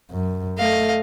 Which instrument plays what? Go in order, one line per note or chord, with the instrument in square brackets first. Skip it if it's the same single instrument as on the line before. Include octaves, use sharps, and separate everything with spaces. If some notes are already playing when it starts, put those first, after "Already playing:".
[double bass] F#2
[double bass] A3 [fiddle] D#5 F5